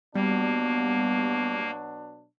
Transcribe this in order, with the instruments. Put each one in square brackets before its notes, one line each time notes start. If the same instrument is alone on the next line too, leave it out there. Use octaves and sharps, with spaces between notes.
[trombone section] B2 F#3 D4 [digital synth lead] G3 [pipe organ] A#3 [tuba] B3